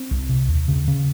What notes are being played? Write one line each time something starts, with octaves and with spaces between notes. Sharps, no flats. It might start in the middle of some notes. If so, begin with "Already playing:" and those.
Already playing: C4
C2
C3
D#2
C#3
C#3